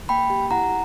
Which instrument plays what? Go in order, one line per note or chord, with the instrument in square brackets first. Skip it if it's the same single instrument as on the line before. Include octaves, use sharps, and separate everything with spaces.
[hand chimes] A#3 G5 B5
G4
E4 F#5 A#5